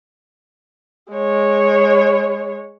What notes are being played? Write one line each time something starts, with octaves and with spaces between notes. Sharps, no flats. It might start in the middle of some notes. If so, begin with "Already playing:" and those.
G#3 C#5